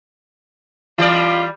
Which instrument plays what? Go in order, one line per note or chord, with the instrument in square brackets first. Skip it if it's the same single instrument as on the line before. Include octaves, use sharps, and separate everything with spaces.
[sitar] E3 G3 D5 [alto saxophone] F4